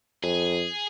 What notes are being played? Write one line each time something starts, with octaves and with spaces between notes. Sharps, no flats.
F2 G#4